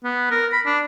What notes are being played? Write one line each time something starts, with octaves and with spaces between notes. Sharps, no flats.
B3
A#4
B5
D4